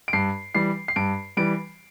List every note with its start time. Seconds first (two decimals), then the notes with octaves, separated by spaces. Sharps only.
0.08 D7
0.13 G2 C7
0.55 E3 G3 C7
0.88 C7
0.96 G2 D7
1.37 E3 G3 D7